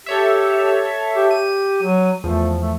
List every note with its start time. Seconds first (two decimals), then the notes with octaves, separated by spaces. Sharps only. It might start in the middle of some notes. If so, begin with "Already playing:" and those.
0.06 G4 A4 C#5 E5
1.16 G4
1.31 G4 D#7
1.83 F#3
2.24 E2 F3 A3
2.62 A3